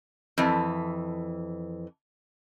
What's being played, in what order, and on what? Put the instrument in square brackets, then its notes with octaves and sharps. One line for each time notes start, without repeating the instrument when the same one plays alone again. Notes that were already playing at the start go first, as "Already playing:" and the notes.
[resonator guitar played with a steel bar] F2 E3